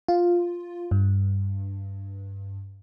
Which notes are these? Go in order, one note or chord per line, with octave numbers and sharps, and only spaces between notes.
F4
G2